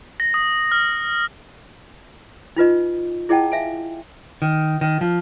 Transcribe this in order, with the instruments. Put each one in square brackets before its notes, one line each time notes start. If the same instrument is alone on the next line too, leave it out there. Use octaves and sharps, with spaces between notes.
[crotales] A#6
D#6
F6
[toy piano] D#4 F4 B4 D#5
E4 G#4 D#5 F#5 G5 A5
E5 F5 G#5
[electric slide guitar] D#3
D#3
F3